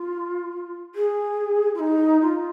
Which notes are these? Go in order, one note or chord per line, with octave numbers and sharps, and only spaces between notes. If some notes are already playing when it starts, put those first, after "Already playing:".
Already playing: F4
G#4
F4
D#4
F4